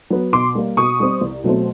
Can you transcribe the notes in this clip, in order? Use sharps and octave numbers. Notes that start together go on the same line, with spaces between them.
F#3 B3
B2 C6 D6
G3 A#3
B2 C#6 D#6
G3 C4
C2
B2 F#3 A3 C4